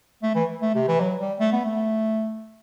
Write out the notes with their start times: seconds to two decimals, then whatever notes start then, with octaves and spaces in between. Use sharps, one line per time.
0.23 A3
0.35 E3
0.62 A3
0.75 C3
0.88 E3
1.00 F#3
1.20 G3
1.40 A3
1.53 B3
1.65 A3